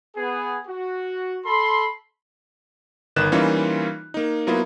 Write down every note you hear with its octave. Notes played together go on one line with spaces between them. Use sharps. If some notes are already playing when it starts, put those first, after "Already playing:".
B3 G#4
F#4
A4 B5 C6
G1 D#3 B4 F#6 E7
E3 G3 A#3 C#4 D#4 F4
A#3 D#4
F#3 A#3 B3 E4 F4